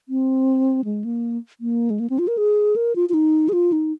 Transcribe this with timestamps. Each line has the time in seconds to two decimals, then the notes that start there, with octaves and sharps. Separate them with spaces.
0.09 C4
0.84 G#3
1.04 A#3
1.61 A#3
1.90 G#3
2.00 A#3
2.10 C4
2.19 F4
2.28 A#4
2.38 G#4
2.76 A#4
2.96 F4
3.09 F4
3.14 D#4
3.49 G#4
3.53 F4
3.72 D#4